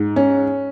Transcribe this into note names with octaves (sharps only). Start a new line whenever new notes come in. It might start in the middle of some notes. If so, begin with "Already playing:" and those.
Already playing: G#2
C#4